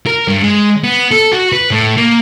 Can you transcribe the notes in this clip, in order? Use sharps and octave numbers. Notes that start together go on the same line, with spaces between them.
A#4
G2
G#3
B3
A4
F#4
B4
A2
A#3